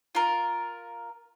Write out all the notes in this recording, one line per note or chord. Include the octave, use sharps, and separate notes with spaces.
F4 A#4